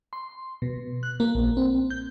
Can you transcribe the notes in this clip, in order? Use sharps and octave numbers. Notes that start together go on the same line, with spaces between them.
C6
B2
F#6
A#3
A#1
C4
G6